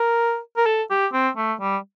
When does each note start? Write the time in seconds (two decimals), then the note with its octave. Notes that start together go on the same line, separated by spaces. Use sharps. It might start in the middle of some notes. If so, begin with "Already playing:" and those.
Already playing: A#4
0.57 A#4
0.66 A4
0.91 G4
1.13 C4
1.37 A3
1.61 G3